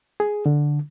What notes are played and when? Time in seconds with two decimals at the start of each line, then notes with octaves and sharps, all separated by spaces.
0.20 G#4
0.46 D3